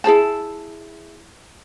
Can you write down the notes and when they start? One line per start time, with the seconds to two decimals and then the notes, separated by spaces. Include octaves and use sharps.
0.04 E4 G#4 C5 A5